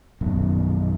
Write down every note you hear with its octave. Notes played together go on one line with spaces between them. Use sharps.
A#1 F#2 B2 D#3